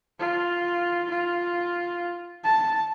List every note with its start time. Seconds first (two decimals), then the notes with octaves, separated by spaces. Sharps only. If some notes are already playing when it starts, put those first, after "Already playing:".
0.19 F4
1.10 F4
2.44 A5